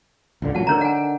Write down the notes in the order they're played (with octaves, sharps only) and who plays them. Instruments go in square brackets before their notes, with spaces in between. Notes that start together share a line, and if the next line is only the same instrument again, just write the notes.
[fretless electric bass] C#2 G#2 D3
[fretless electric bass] A1 A#2 F#3 [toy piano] F#5 A5
[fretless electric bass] D3 D#3 [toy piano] A#4 C#5 A#5
[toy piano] F#5 G#5